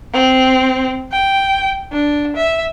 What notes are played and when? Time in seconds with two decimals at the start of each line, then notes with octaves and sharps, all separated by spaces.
0.14 C4
1.12 G5
1.93 D4
2.37 E5